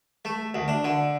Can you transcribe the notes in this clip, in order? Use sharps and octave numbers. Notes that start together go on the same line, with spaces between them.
A3
D2
D4
D3